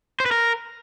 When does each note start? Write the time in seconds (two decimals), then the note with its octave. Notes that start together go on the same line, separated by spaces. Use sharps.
0.20 C5
0.26 B4
0.31 A#4